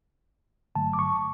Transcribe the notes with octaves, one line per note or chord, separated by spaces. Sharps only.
G1 G2 D3 F#3 A3 A5
D6
C#6